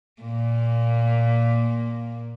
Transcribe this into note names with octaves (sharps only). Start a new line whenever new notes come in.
A#2 A#3